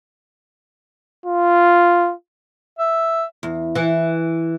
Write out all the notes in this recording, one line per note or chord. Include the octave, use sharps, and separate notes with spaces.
F4
E5
E2
E3